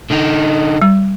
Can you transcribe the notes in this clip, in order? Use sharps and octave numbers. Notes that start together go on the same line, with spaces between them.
D3 D#4
G3